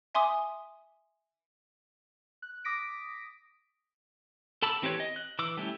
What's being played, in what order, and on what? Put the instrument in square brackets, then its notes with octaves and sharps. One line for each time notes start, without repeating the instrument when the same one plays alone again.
[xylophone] E5 G#5 C6 D6 D#6
[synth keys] F#6
D6 D#6 A#6 B6 D7
[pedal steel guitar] A4 A5 B5 D6 E6
E3 C4 G4 B4 C#5
D#5
F#6
E3 D6 E6
G3 A3 C#4 E4 G4